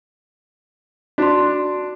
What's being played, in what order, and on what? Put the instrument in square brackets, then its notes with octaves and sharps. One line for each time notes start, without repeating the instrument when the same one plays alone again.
[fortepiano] D4 [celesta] F#4 C6